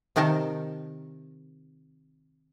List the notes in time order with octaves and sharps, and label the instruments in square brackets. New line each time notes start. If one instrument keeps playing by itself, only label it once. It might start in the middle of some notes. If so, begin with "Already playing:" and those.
[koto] C3 D#3 D#4 A#4 A5